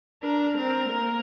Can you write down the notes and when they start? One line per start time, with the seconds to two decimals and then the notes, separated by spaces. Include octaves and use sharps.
0.23 D4 A#4
0.56 C4 A#4
0.90 A#3 A#4